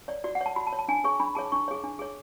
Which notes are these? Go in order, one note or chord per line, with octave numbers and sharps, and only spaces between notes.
C#5 D5
F#4 D5
F#5
C#5
A5
F#4 B5
A5
C#5
A5
D4 G#5
G#4 C#5 C#6
D4 B5
G#4 C#5 A5
D4 C#6
G#4 C#5
D4
G#4 C#5